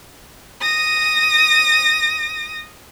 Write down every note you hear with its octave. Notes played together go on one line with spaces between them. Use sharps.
D#6 A#6